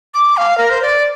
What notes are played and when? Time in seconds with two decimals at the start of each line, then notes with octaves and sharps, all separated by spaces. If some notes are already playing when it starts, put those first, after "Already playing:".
0.14 D6
0.37 F5
0.58 A#4
0.70 C5
0.82 D5